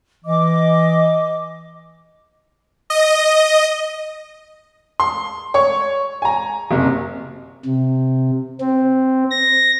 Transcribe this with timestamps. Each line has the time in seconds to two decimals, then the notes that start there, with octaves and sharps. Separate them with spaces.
0.25 E3 D#5 D6
2.90 D#5
5.00 C6
5.54 C#5 C#6
6.22 G#5 A#5
6.71 F#1 C3
7.65 C3
8.61 C4
9.31 A#6